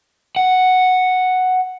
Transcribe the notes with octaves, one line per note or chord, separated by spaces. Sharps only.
F#5